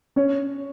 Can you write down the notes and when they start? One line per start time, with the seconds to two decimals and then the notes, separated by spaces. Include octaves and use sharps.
0.16 C#4 C#5